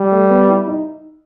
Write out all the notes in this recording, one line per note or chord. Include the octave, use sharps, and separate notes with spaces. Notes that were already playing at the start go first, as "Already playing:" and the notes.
Already playing: G3
A3
B3
E4
D#4